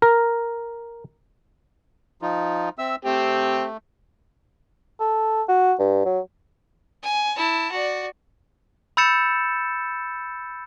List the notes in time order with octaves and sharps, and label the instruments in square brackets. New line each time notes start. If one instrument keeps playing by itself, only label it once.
[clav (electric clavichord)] A#4
[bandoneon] F3 D#4 F4
C4 E5 E6
[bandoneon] A3 [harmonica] C4 G4
[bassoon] A4
F#4
G2
F#3
[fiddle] G#5
E4 A5
F#4 D5
[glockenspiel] B5 E6 G6 A6 C#7 E7